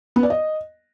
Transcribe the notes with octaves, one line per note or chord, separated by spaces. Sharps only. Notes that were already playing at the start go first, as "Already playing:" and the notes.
B3
D5
D#5